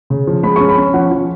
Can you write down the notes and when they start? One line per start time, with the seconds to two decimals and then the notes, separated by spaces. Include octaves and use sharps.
0.10 C#3
0.27 F3
0.43 G#3 B5
0.56 C#4 C#6
0.69 B5
0.78 C#4
0.94 F3 F#5
1.11 F3